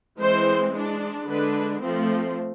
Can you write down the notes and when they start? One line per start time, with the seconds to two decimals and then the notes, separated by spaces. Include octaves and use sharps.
0.19 E3 G#3 C4 C5
0.73 G#3 D4
1.28 D3 G#3 D4 B4
1.81 F3 A3 C4